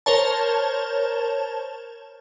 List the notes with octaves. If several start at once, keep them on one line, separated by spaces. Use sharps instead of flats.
A#4 C5 C#5 A5